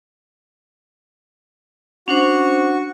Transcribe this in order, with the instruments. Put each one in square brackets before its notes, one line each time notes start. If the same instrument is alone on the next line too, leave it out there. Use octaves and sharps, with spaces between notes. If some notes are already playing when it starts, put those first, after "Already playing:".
[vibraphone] C#4 D4 C5 [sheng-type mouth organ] F#4 C#6